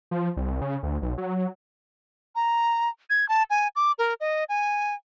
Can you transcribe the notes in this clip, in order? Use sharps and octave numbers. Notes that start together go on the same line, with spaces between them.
F3
C2
C#3
D2
B1
F#3
A#5
G#6
A5
G#5
D6
A#4
D#5
G#5